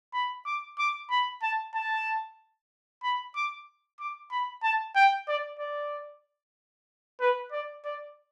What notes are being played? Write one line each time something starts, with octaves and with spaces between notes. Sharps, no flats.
B5
D6
D6
B5
A5
A5
B5
D6
D6
B5
A5
G5
D5
D5
B4
D5
D5